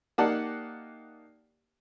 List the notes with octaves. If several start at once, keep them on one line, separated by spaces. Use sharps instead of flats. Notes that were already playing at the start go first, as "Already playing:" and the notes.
A#3 D#4 G4 D5 F#5 A5